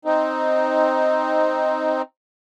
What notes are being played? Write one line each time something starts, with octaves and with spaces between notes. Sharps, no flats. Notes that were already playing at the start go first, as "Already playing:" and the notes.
C4 D#4